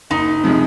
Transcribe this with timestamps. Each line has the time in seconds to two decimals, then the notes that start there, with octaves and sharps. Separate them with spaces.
0.10 F#1 D#4
0.44 C3 F3 G#3